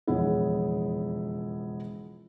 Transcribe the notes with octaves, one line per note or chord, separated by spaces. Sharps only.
E1 F2 C#3 B3 E4 G#4